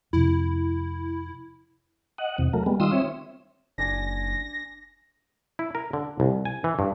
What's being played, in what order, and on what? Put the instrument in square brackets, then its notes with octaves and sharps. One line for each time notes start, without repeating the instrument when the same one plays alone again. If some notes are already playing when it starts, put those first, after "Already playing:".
[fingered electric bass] F2 C3 [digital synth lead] E4
[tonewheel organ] D#5 F#5
E2 C3
F#3 A3 A#4
G3 G#3 B3
D#3 G3 F4 C6 D#6 E6
C4 C#5 E5
[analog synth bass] F#1 [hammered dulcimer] D4 G#5 D6 [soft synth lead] A#6
[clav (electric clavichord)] E4
A#4
D3
C2
G#5
E3
G2